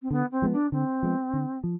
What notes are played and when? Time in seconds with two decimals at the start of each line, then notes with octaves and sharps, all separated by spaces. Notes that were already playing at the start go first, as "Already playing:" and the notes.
0.02 C4
0.11 D3 B3
0.31 C4
0.42 F3 G#3 B3
0.52 D4
0.72 D3 C4
1.03 F3 G#3 B3
1.33 D3
1.64 F3